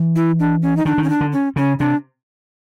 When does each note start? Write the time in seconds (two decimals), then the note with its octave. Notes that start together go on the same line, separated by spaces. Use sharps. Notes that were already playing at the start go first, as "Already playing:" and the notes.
Already playing: E3
0.16 E4
0.39 D4
0.62 C#4
0.77 D#4
0.85 D#3 D4
0.98 D#3
1.04 C#4
1.10 D4
1.21 D3
1.32 C#4
1.56 C#3 C#4
1.79 C3 D4